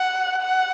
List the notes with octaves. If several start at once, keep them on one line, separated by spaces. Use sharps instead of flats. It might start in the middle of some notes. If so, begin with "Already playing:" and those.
Already playing: F#5
F#5